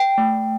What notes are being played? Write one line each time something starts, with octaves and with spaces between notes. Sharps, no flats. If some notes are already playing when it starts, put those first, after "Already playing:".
Already playing: G5
A3